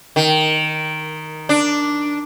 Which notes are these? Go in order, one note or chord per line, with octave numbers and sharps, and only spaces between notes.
D#3
D4